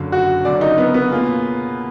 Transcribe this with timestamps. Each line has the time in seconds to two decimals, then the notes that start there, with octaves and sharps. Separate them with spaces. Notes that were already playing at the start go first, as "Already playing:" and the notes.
Already playing: F#1 F#2 D3
0.12 F#4
0.45 F#1 F#2 D3 D5
0.61 D#4
0.78 B3
0.94 B3
1.11 B2 A#3 F4 G#4